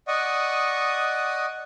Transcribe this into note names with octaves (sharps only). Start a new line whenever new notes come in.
D5 D#5 F#5 C#6 D#6